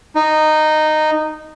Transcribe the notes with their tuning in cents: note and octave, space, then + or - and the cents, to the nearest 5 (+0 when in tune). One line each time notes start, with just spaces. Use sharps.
D#4 -10